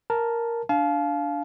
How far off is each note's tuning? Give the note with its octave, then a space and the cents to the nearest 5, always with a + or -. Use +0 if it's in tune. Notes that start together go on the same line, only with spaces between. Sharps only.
A#4 +0 A5 +0
D4 -5 F5 +0 A5 -40